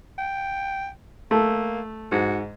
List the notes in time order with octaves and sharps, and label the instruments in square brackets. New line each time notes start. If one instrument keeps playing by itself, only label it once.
[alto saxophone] G5
[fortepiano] A3 [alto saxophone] A#3
[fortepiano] G#2 [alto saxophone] F#4